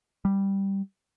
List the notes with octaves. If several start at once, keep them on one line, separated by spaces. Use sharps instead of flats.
G3